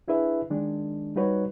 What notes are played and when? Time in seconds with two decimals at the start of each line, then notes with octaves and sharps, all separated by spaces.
0.08 D4 E4 G#4 B4 E5
0.50 D#3 G#3 D4
1.16 G3 D#4 F#4 B4 C#5